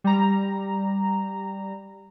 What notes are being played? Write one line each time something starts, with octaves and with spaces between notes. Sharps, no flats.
G3 A#5